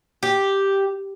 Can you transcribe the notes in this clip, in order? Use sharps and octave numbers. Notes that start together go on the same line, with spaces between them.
G4